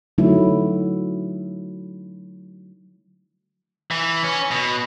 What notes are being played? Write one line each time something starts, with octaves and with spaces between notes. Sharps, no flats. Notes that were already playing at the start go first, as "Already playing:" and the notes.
D3 F#3 A3 D#4 E4
E3
C#4
B2